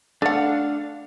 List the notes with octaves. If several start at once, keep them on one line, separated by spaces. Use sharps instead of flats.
A3 D4 F5 F#5